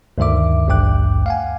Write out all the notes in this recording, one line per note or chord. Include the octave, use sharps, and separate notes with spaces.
D2 G2 D#3 E5 D6
A1 D2 G2 G5 D6 F#6
F5 F#5 G#5